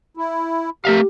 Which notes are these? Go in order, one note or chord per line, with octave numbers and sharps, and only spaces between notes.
E4
A3 G4 A#4 E5 F5